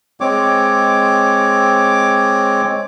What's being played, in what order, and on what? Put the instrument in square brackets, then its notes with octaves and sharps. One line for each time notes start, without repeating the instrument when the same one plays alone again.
[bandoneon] G#3 C4 C#5 D6